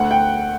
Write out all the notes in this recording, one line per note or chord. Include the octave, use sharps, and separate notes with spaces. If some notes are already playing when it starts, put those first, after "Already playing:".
Already playing: D2 F#5
G5